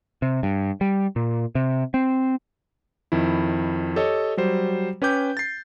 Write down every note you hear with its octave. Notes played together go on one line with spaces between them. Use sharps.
C3
G2
G3
A#2
C3
C4
F2 D#3 E4
G4 A4 C#5 D#5
F#3 G3 C5
C#4 B4 G5 D6 G6
A6 C7